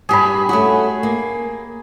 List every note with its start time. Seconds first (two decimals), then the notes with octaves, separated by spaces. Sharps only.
0.09 G2 G4 G#4 B5
0.49 A3 C#4 F#4
1.03 A#3